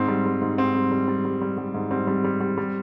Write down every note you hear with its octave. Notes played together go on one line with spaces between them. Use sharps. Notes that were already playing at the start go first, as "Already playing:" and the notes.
Already playing: G#2 C4
G3
G3
G#2
G#2 C4
G3
G3
G3
G3
G3
G3
G#2
G3 C4
G3
G3
G3
G3